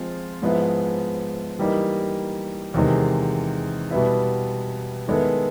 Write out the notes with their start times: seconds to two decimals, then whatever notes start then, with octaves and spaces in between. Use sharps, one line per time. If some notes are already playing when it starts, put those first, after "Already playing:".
Already playing: F3 G#3 C4 F4
0.42 G#2 F3 G#3 B3 E4
1.59 E3 G3 A#3 D#4
2.74 E2 C3 D#3 G#3
3.91 B2 G3 B3 E4
5.08 D#3 G#3 B3 E4 A4